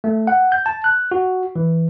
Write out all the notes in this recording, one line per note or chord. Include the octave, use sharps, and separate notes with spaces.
A3
F#5
G6
A5
F#6
F#4
E3